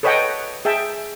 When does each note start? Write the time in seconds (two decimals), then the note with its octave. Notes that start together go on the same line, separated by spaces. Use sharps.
0.03 A4 B4 C#5 D#5 F#5 G5
0.65 G#4 E5 G5 A5